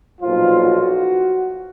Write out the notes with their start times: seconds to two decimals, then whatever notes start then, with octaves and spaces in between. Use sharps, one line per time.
0.21 B1 A#2 F3 F4
0.62 F#4